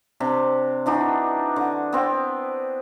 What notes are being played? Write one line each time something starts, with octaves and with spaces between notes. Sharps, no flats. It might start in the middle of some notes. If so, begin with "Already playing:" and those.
C3 C4 D4
E3 D4 D#4 F#4
D3
B3 C4 G5